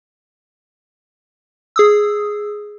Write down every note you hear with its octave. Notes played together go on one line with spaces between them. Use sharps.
G#4 D#6 E6